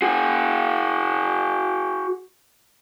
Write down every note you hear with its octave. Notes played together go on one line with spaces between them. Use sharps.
F#4 G#4